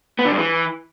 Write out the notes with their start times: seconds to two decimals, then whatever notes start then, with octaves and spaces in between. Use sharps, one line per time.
0.19 B3
0.25 D3
0.32 G2
0.38 E3